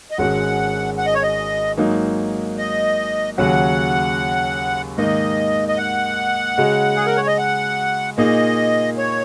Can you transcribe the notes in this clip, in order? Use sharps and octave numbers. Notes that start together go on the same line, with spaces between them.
D#5
G#1 G#2 G#3 C#4 F#4 F#5
F#5
D#5
C#5
D#5
G#2 F#3 A#3 D#4
D#5
D#2 C#3 F#3 C#4 F#4 F#5
G#2 D#3 A#3 D#4 D#5
D#5
F#5
C#3 G#3 F#4 D#5
G#4
A#4
C#5
D#5
F#5
A#2 A#3 D#4 G#4 D#5
C#5